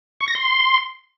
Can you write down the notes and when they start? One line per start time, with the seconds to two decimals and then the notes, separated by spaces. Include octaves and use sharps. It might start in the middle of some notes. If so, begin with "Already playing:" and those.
0.21 C#6
0.28 A#6
0.35 C6